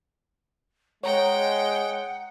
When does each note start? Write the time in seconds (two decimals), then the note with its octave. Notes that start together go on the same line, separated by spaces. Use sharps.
1.04 G#3 C#5 F#5 G5 A#5